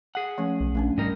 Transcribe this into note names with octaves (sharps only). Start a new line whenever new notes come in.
G#4 F#5
F3 A3 C#4
B1
A#1 A3 C#4 D4
G#2 G3 D#4 A#4